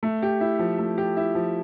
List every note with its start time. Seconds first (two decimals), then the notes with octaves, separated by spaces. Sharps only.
0.03 A3
0.22 G4
0.41 E4
0.59 F3
0.79 A3
0.98 G4
1.17 E4
1.35 F3